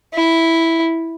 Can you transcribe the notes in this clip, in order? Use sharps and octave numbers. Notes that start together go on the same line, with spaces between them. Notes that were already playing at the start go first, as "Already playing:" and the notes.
E4